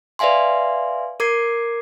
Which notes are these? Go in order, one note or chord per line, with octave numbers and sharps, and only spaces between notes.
B4 D5 E5 F5 G#5 C6
A#4 D6 G#6 C7